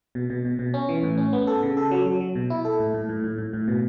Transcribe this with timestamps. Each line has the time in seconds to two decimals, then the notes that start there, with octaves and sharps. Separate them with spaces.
0.15 B2
0.30 B2
0.45 B2
0.59 B2
0.74 C#4
0.89 E3
1.03 A2
1.18 C#4
1.33 B3
1.47 A4
1.63 C#3
1.77 A4
1.91 F#3
2.06 F#3
2.21 F#3
2.35 B2
2.50 E4
2.65 A4
2.80 A2
2.94 A2
3.09 A2
3.24 A2
3.38 A2
3.53 A2
3.68 B2